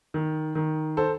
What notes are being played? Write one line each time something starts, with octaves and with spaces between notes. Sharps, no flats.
D#3
D#3
A4 C5